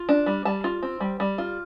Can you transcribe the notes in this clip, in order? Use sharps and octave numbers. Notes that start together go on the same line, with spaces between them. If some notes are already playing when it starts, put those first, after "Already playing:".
Already playing: F4
D4
G3
G3 A5
F4
C4
G3
G3
F4